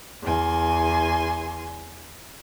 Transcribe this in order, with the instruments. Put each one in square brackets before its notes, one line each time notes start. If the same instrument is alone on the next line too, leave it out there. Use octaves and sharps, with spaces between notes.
[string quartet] E2 G#5 C6